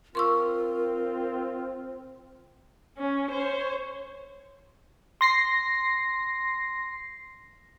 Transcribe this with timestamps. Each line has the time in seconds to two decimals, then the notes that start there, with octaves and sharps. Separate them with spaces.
0.15 C4 F4 A#4 C6 C#6 E6
2.98 C#4
3.31 C5 C#5
5.21 C6 A#6 C7